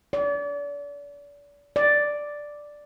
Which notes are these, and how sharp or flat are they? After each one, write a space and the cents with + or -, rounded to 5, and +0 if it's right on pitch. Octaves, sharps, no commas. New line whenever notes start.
D5 -35
D5 +0